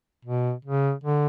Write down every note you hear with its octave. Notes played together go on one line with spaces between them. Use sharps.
B2
C#3
D3